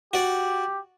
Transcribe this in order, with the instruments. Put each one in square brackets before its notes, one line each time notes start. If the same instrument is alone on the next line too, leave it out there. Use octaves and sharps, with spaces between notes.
[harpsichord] F#4 D5 [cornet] G4